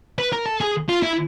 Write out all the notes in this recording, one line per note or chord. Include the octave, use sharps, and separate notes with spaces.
B4
A#4
A4
G#4
F4
E4